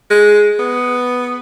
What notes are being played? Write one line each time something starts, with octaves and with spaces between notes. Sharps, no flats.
G#3
B3